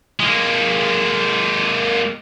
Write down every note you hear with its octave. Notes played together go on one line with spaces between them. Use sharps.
G#3 A#3